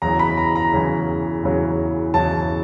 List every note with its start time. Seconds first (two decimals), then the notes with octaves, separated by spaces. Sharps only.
0.02 E2 C#3 F#3 A#5
0.19 B5
0.37 A#5
0.55 A#5
0.73 E2 C#3 F#3
1.43 E2 C#3 F#3
2.14 E2 C#3 F#3 A5